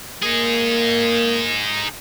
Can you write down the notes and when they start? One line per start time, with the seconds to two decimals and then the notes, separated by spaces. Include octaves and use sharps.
0.23 A#3 D#4 G#4